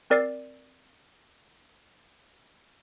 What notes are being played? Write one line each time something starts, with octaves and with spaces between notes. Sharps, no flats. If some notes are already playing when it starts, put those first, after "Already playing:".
C4 A#4 D5 E6 A6 C7